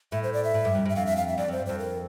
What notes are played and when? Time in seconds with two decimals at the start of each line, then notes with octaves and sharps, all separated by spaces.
0.12 A2 E5
0.23 C5
0.33 D5
0.44 E5
0.54 A2
0.65 G2
0.75 F2
0.85 G2 E5
0.96 F2 F5
1.06 E5
1.17 F5
1.28 E5
1.38 F2 D5
1.48 F2 C5
1.59 G2
1.66 F2 C5
1.79 A#4